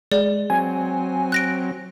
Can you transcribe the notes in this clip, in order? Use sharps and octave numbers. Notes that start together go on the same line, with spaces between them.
G#3 D5
F#3 C4 G#5
F#6 A#6 D7